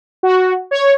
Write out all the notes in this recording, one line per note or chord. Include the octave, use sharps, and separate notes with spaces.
F#4
C#5